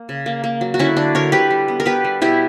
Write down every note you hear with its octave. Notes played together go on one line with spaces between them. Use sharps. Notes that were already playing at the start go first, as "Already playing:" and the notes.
Already playing: A#3
C#3
A#3
A#3
F#3
F#4
D3 C#4 E4
D3 D4
D3 A#4 C#5
D3 G4 B4
G3
B3
A#4
B3 G4 B4
G3
B2 E4 G4